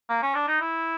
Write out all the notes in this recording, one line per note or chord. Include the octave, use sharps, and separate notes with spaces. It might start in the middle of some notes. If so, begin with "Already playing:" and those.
A#3
C#4
D4
D#4
E4